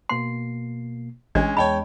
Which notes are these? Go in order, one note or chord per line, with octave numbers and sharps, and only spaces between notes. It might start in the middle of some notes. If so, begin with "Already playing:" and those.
B2 A#3 C6 C7
A1 G#3 C#4 D4 D#5 G#6
E2 G#3 C#5 D#5 G5 A5 B5